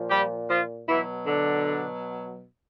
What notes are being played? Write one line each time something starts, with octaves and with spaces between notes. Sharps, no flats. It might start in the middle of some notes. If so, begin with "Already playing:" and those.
Already playing: A#2 F3
G3 G4
F3 F4
B2 E3 F#3 E4
D3 D4